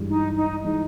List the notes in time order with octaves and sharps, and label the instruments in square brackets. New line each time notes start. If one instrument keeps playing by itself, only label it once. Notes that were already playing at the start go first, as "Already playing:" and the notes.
Already playing: [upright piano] G2 E3 G#3
[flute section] D#4
D#4
[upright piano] E3 G#3 [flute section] D#4